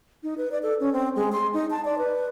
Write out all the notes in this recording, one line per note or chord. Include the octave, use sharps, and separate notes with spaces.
D#4
B4
D5
A4
C#4
C4
G#3
C6
D#4
A5
D5
B4